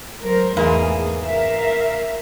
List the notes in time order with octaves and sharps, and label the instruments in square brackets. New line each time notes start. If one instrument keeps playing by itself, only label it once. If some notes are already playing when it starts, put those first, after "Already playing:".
[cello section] F#3 A#4 C5
[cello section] E2 A3 G#4 [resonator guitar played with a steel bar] G#2 E3 A#3
[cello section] A#4 E5 F5